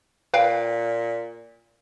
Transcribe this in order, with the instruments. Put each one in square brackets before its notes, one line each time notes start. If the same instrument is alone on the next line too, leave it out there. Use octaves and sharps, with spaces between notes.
[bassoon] A#2 [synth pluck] B4 F5 G5